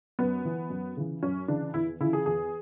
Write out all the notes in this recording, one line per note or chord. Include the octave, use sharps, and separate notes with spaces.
F#2 B3
E3
F#2
C#3 E3
F#2 C#4
C#3 E3 D4
E2 E4
C#3 E3 E4
G#4
E2 G#4